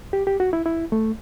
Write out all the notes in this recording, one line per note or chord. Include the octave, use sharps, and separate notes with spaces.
G4
G4
F#4
E4
E4
A3